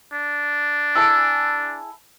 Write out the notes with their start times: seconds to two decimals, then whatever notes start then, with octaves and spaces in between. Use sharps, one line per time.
0.13 D4
0.95 E4 G#4 A5